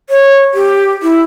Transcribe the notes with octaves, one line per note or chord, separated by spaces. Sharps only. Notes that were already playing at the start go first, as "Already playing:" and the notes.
C#5
G4
E4